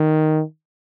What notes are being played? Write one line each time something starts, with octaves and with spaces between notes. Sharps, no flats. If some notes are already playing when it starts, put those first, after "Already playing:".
Already playing: D#3